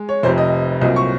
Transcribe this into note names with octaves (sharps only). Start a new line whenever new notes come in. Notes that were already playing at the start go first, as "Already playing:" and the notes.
Already playing: G#3
C#5
F1 F2 C3 C5
D#5
C2 A#2 F#3 C4 D#5
C#6